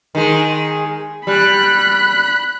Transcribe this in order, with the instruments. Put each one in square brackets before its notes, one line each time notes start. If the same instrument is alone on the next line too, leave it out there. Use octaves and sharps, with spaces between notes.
[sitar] D#3 G#3
[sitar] G3 [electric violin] B5 F#6